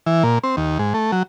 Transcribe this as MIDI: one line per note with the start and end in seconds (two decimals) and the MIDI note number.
0.06 0.23 52
0.23 0.39 46
0.44 0.56 60
0.57 0.78 39
0.79 0.93 44
0.94 1.11 57
1.12 1.23 54